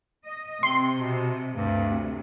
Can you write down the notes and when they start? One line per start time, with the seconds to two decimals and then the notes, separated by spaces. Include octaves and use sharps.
0.24 D#5
0.63 C3 C4 C6
0.97 B2
1.54 D2 G2 C3